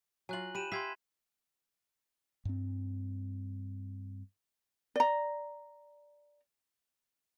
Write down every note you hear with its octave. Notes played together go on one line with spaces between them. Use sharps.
F#3 F4 G#5 F#6 F#7
G4 B5 D#7 E7
G4 E5 F5 C6 G#6 B6
G2 C4
D5 A#5